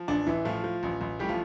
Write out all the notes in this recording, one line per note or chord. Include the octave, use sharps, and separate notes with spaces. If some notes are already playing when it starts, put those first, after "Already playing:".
Already playing: F3
A1 D4
A1 E3 E4
A2 F3 F4
F3
A1
A1
A2 G3 G4
F3 F4